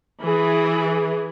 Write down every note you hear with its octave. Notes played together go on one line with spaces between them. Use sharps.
E3 G#4